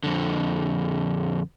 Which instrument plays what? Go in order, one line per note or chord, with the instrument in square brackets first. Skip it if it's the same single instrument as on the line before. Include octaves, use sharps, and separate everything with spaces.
[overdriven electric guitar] F2 D3